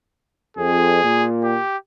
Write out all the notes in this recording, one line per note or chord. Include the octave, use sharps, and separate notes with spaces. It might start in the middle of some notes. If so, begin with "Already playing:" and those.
F2 G#4
A#2
G4